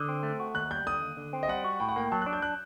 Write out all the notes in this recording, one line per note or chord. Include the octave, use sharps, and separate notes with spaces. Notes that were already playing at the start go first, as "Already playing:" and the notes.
Already playing: D3 D#6
C4
A3
F#4
D#2 F#6
G3 G6
D3 D#6
D#2
D3
C4
D#5
G3 F#5
F#4
A2 G5
F#5
A#3 G5
F#3 A5
D4 F#6
G6
F#6